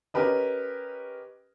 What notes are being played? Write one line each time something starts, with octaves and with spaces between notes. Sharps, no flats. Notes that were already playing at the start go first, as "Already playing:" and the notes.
C#4 G4 A#4 B4 D#5